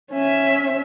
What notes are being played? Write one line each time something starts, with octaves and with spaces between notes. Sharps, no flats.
C#4 E5